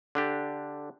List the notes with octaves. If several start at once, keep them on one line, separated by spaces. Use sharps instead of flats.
D3 D4 G4